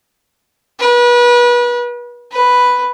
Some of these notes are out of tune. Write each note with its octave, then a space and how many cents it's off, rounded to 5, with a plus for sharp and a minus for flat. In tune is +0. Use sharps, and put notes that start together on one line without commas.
B4 -35
B4 +0